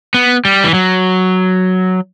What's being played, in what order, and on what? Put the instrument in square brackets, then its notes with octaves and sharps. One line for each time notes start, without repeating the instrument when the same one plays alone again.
[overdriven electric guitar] B3
G3
E3
F#3